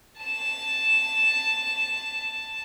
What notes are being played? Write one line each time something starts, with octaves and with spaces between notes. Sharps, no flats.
A5 E7